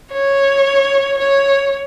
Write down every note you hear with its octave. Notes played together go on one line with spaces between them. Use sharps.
C#5
C#5